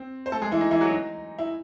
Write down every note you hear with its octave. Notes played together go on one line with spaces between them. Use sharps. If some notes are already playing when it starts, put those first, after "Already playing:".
Already playing: C4
C5
A3 A4
G#3 G#4
E3 E4
D#4
E3 E4
F#3 F#4
D#4
E4